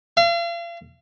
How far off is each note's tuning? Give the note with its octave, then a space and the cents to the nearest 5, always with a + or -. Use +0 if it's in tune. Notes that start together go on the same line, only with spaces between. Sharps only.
F5 -40